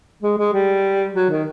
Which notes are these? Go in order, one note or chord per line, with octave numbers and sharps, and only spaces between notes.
G#3
G#3
G3
F#3
D#3